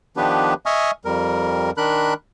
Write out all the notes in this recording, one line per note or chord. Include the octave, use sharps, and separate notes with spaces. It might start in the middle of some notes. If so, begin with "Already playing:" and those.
D#3 F3 B3 D4 G4 B4
D#5 E5 G#5 C#6 D#6 F6
F2 G3 A#4
D#3 D4 A#4 B5 F#6